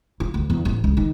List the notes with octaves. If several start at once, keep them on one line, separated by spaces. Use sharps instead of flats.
F4
D2
E2
A1
C#2
D#3